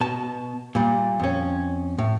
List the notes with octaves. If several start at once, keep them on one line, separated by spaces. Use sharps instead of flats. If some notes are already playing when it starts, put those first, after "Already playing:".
B2 A5
A#2 G3
F2 C#4
A2